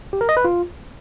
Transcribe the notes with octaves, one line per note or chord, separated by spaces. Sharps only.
G4
A#4
D#5
B4
F4